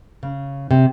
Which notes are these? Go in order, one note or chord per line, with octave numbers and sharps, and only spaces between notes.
C#3
C3